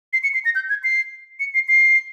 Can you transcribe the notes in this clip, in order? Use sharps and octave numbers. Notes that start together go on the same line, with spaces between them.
C7
C#7
C7
A#6
G6
G#6
C7
C#7
C7
C7